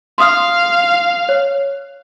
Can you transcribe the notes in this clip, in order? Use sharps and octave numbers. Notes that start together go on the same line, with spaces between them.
F5 C6 D#6 F6
C#5